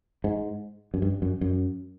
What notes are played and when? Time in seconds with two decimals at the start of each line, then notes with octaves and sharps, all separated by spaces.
0.24 G#2
0.94 F#2
1.02 G2
1.22 F#2
1.41 F#2